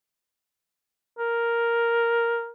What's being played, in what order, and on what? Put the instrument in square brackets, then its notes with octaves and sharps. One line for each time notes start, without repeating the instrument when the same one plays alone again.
[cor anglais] A#4